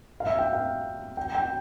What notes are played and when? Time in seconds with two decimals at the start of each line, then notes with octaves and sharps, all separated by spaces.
0.20 F5
0.27 E5
0.39 G5
0.53 F5
1.17 G5
1.35 G5